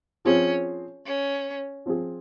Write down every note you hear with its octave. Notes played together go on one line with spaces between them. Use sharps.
F3 C4 C#4 F4 G#4
C#4
F3 C4 F4 G#4